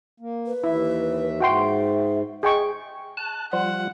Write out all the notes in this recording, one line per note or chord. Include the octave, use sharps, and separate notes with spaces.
A#3
B4
D#2 E3 E4 E5
G#2 F#4 E5 G5 C6
G#4 D#5 G5 C#6
A5 F#6
F3 G3 F4 F#5